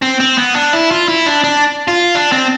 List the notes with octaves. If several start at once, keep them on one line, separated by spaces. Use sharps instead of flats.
C4
C4
B3
D4
E4
F4
E4
D4
D4
F4
D4
C4